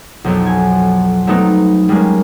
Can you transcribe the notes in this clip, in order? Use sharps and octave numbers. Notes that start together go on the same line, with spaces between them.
B1 F2 F#3
G#5
F#3 G3 A3 B3 C4 D#4
G3 G#3 A#3 C#4